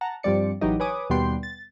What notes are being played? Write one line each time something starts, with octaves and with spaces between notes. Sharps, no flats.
F#5 A5 A#5
G2 F3 G3 C4 D5 C#7
A1 E3 F#3 D#4 G4 D#5
B4 C#5 G#5 D6 D#6
D#2 B2 G3 B3 G5 C6
A6